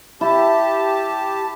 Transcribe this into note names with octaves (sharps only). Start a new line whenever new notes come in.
E4 G4 A5